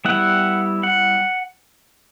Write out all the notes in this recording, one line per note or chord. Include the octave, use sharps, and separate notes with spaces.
G3 B3 E4 F#5
F#5